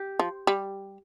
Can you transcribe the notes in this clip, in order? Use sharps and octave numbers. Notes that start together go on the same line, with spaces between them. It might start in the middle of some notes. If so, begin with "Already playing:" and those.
Already playing: G4
F3
G3